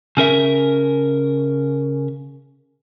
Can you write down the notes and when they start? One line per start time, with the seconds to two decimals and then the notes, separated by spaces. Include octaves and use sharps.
0.17 C#3 C#4 A#4 E5